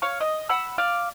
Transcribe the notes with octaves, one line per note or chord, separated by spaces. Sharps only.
C#5 F5 C#6
D#5
F#5 B5 E6
D5 F5